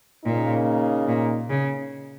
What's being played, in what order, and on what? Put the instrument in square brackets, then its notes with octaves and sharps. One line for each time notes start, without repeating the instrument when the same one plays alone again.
[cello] A#2 [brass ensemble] C#3 A#3 D#4
[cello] A#2
C#3